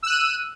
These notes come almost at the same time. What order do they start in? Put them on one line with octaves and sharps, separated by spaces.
E6 F#6 D#7